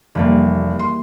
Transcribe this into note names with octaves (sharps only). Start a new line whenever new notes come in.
F1 E3 G3 A#3
C6